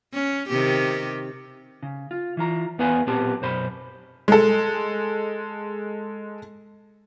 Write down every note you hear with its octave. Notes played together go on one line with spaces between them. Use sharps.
C#4
C3 D#3 G4
C#3
F4
E3 F4 A#5
E2 B3 B4 F5 G#5
B1 A#2 B3 C4 G4 A5
F#2 B2 C5 B5
G#3 A4